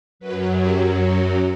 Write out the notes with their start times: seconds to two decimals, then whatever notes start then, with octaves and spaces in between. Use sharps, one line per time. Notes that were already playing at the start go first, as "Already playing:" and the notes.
0.19 F#2 F#3 B4
0.60 G4
1.03 F#4